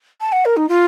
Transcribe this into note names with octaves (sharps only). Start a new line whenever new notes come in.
A5
F#5
A#4
D#4
F4